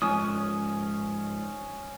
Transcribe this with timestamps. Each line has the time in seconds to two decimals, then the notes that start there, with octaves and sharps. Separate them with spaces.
0.02 G#2 F3 C#4 D#6